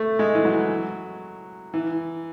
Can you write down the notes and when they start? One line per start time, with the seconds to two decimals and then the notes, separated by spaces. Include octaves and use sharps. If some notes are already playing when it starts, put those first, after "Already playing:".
Already playing: A3
0.19 G#3
0.35 E3
0.45 F#3
1.74 E3